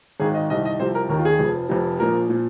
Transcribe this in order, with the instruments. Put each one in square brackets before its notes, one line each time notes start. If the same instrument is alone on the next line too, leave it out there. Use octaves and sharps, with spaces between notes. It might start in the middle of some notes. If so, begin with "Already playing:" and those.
[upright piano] G#1 G#2 D#3 G#4
D#5
C2 C3 D#3 D#5
D#5
C2 C3 F3 C5
A#4
D#2 D#3 A#4
F4
G#4
F1 F2 F3
F1 F2 C3 F3
A#1 A#2 F3 A#4
A#2 F3